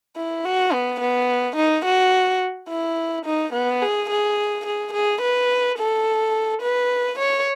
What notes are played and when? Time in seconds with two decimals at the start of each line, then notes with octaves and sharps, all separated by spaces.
0.16 E4
0.45 F#4
0.73 B3
1.00 B3
1.56 D#4
1.85 F#4
2.68 E4
3.26 D#4
3.53 B3
3.82 G#4
4.10 G#4
4.66 G#4
4.94 G#4
5.21 B4
5.79 A4
6.62 B4
7.19 C#5